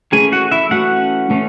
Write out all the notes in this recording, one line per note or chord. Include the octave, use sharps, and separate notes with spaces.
E3 A3 C#4 G#4 G#5
F#4 F#5
E4 E5
E3 A3 C#4 F#4 F#5
E3 A3 C#4